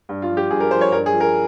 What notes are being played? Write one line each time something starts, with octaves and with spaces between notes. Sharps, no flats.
G2
F4
F3
G4
G2 G#4
A#4
F3 C5
C#5
G2 A#4
G#4
F3
A#4